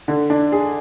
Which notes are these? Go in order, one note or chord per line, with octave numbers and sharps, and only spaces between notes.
D3
D4
G#4